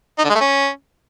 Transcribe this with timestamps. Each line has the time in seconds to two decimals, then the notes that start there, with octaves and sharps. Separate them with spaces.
0.19 D#4
0.24 D3
0.30 G#3
0.35 A3
0.41 C#4